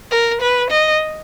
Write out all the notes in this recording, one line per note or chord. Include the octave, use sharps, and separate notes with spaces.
A#4
B4
D#5